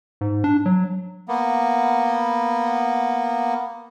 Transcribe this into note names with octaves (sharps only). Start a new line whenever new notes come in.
G#2
D4
F#3
A#3 B3